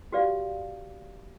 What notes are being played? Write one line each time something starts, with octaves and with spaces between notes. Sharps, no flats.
F#4 G4 B4 D5 F5